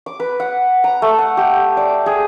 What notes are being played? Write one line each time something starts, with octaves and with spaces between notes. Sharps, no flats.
D6
B4
F#5
A#5
A3
F#5
G4
D5
G#4